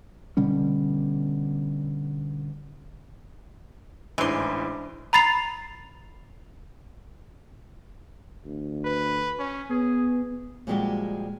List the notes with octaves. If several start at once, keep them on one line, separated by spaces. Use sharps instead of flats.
B2 D3 G3 C#4
A1 G#2 E3 D4 E4 C5 C6 D6
A#5 B5 A6 C7 F7
D2
B4
C#4
B3 G#4
A#2 F3 G3 G#3 F#4 G4